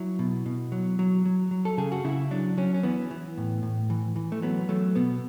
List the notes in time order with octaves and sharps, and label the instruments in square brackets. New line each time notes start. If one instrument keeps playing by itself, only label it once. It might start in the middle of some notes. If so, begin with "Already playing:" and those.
Already playing: [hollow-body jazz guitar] F#3 E4
B2
B2
F#3
F#3
F#3
F#3
A4
C#3 G#4
F#4
C#3 E4
F#3 D4
F#3 C#4
C#4
E3 B3
E3
A2
A2
E3
E3
A3
F#3 B3
F#3 A3
B2 B3